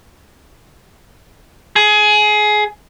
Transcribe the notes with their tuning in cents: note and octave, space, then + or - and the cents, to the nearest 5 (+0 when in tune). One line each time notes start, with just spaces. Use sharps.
G#4 +20